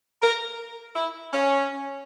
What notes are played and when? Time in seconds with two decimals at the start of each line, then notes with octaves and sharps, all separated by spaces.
0.22 A#4
0.95 E4
1.33 C#4